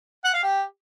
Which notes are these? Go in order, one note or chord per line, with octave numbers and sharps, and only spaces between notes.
F#5
F5
G4